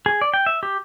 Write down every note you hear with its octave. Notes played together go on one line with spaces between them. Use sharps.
G#4
D5
G5
E5
G4